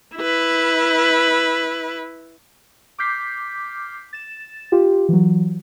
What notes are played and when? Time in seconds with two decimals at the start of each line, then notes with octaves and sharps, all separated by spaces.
0.16 E4 B4
2.98 D6 F6 G6 B6 C7
4.13 A6 E7
4.72 F4 G4
5.09 E3 F#3